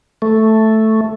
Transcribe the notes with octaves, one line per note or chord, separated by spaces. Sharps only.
A3